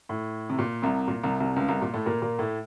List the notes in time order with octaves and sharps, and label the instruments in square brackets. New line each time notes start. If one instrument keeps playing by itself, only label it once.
[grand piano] A2
C3
A#2
C2 C3
A#2
C2 C3
C2 C3
C#2 C#3
C2 C3
A#2
A2 A3
A#2 A#3
A#2 A#3
A2 A3